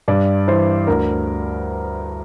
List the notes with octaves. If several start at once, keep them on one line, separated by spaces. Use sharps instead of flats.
G2 D5
E3 C5
D2 A#4